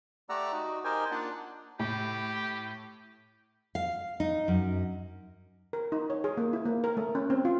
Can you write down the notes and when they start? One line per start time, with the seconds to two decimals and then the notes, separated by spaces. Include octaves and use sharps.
0.29 A3 G4 D5 F#5 A#5 E6
0.53 D#4 F#4
0.84 D#4 G4 A#4 C5 G5 G#5
1.11 A#3 D4 F4 D5 F#5
1.79 A2 G4
3.75 F5
4.20 D#4
4.48 F#2
5.73 A#4
5.92 D#4
6.10 C#5
6.24 G#4
6.37 A#3
6.53 E4
6.65 A#3
6.84 A#4
6.97 A3
7.15 C#4
7.30 C4
7.45 F4